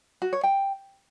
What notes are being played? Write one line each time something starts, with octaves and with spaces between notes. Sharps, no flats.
F#4
C#5
G5